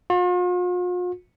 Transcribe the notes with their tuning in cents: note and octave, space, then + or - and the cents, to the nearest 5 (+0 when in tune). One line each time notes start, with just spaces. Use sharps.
F4 +45